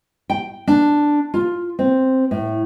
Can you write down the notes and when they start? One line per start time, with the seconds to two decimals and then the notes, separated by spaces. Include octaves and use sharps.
0.30 G5
0.67 D4
1.34 F4
1.79 C4
2.31 A2